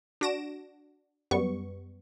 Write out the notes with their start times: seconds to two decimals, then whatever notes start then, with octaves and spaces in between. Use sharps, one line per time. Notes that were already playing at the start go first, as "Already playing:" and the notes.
0.21 D4 F#4 A#6 D7 E7
1.31 F#2 G3 B3 C#6